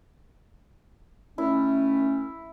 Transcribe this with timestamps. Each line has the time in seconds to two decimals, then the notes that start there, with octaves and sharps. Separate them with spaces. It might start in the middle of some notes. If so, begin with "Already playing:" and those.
1.38 D#3 A3 C#4 E4